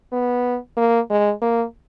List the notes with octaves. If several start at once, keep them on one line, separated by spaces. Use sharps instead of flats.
B3
A#3
G#3
A#3